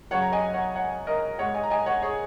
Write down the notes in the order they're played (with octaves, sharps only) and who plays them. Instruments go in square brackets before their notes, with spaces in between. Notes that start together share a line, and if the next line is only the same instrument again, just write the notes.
[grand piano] F#2 C#3 F#3 C#5 F#5
A#5
D#5 G#5
C#5 F#5
C#5 F#5
A#4 D#5
G#2 G#3 C#5 F#5
D#5 G#5
A#5
D#5 G#5
C#5 F#5
G#4 C#5